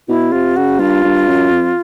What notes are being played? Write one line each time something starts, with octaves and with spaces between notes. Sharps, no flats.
B2 E4
C3 F4
C#3 F#4
G2 F4
G2
F#2
F2